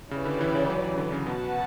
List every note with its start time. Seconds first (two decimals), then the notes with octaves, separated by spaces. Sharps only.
0.11 C#3 C#4 E4 G4 B4 D5
0.25 D3
0.41 E3
0.55 C#3
0.70 F#3
0.83 E3
0.98 D3
1.12 C#3
1.27 B2 F#4 B4 F#5 A5